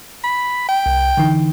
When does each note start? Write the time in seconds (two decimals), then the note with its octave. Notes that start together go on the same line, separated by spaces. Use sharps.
0.24 B5
0.69 G5
0.86 C2
1.17 D3 E3 D#4